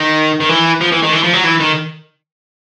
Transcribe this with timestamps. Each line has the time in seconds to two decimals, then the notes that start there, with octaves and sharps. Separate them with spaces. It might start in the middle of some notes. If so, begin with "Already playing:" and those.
Already playing: D#3
0.40 D#3
0.49 E3
0.81 F3
0.92 E3
1.03 D#3
1.13 E3
1.24 F3
1.34 F#3
1.44 E3
1.60 D#3